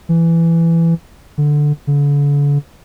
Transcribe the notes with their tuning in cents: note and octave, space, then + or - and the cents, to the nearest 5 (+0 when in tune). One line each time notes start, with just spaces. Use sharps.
E3 +15
D3 +5
D3 -40